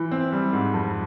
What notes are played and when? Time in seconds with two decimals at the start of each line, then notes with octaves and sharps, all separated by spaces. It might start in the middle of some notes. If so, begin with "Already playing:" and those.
Already playing: E3 E4
0.11 C4
0.32 G3
0.53 G#2
0.74 F2